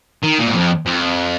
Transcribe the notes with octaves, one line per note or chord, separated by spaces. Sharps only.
D#3
A#2
G#2
F2
F2